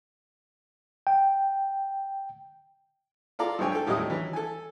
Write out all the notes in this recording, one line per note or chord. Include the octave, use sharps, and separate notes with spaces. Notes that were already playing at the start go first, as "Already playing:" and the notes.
G5
F4 A4 D5 F5 A#5
B1 G2 C5 C#5 G5 G#5
A4 G5
D#2 A2 F#3 G3 C#4 D#5
E3 F#3 C#4
A4 G#5